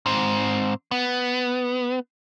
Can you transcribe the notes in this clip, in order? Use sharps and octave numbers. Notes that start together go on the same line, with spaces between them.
G#2 C4
B3